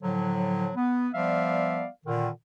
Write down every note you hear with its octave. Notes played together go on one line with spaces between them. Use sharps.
A2 D3 F3 F#3
B3
F3 G3 B3 D5 E5 F5
A#2 D3 D#3